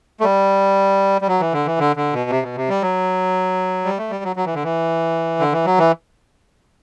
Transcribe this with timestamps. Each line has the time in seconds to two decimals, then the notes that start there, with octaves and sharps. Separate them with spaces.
0.20 A3
0.24 G3
1.22 G3
1.28 F#3
1.40 E3
1.53 D3
1.66 E3
1.79 D3
1.96 D3
2.13 B2
2.30 C3
2.43 B2
2.56 C3
2.69 G3
2.82 F#3
3.85 G3
3.98 A3
4.10 G3
4.24 F#3
4.36 F#3
4.46 E3
4.55 D3
4.64 E3
5.40 D3
5.52 E3
5.65 F#3
5.78 E3